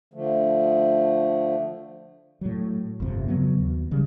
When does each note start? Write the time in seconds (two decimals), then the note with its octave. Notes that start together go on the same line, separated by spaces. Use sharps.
0.14 D3 F3 A3
2.41 A2 F#3
3.00 G1 F2 C3
3.28 C#3 F#3 B3
3.60 D#2
3.91 C#3 F#3 G3